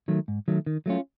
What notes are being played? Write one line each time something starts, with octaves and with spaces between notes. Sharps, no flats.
D#3 F#3 A3
G#2
D#3 F#3 A3
D#3
F#3 A3 C#4 F4